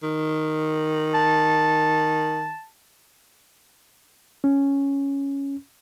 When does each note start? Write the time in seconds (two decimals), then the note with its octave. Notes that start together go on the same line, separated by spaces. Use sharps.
0.03 D#3
1.14 A5
4.44 C#4